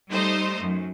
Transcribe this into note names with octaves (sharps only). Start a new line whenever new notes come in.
G3 A3 D#4 C5 D#5
F#2